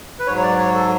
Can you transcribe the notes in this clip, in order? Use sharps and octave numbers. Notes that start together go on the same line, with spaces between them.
B4
G#2 F#3 C#5
C#5
D5
C#5
A4